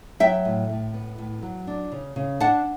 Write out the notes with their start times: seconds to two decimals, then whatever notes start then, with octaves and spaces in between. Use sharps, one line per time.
0.20 F#3 E5 G5
0.45 A2
0.69 A2
0.94 B3
1.18 A2
1.43 F#3
1.67 D4
1.92 C#3
2.16 C#3
2.40 D4 F#5 A5